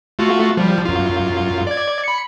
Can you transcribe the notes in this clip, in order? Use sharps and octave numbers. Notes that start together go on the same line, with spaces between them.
A3 F4 F#4
F3 G3
F#2 F4
D5 G#6
B5 C#7